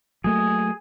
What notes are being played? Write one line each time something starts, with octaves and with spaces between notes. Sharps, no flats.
F#3 A3 A#3 G#4